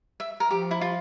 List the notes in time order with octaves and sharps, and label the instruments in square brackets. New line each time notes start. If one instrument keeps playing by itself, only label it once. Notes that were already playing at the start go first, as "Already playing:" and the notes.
[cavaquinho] E5
A#4
[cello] F3 [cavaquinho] G4
[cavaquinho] E4
F4